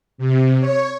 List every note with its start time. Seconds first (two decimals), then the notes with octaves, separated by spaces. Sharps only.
0.18 C3
0.60 C#5